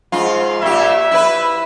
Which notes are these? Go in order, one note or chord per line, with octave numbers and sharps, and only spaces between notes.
G#2 F4
A#2 G4 E5
E4 B4